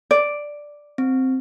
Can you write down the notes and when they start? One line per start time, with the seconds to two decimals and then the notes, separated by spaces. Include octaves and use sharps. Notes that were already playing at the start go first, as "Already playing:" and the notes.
0.11 D5
0.98 C4